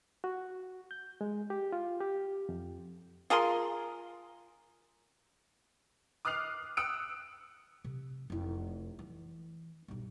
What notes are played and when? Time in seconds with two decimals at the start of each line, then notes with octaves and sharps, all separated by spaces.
0.24 F#4
0.91 G6
1.21 G#3
1.50 G4
1.72 F4
2.01 G4
2.49 F2
3.30 F4 G#4 A#4 C6
6.25 D6 D#6 F6 F#6 C7 F7
6.77 D#6 E6 F#6 C#7 D7
7.84 C3
8.30 F1 E4
8.99 E3
9.88 B1 G2